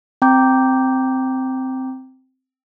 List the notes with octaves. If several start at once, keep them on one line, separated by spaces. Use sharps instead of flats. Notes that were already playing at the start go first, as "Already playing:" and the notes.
C4 G5 A#5 D6 G6